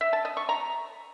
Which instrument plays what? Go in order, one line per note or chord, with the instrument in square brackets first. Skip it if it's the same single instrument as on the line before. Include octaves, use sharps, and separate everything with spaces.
[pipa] E5
A5
D#5
C#6
A#5